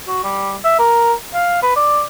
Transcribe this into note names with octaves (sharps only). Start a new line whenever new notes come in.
F#4
G3
E5
A#4
F5
B4
D5